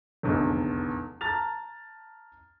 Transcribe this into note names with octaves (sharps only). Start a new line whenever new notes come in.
F1 B1 E2 D3 D#3
A5 A#5 F6 A6 F7